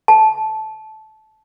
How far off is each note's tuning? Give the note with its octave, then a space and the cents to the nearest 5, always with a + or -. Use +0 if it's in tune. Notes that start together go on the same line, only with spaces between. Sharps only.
A5 -15